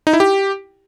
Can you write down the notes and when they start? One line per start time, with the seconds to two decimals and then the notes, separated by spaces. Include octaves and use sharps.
0.07 D#4
0.13 E4
0.20 G4